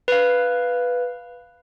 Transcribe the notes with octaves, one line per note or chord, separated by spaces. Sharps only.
B4 F5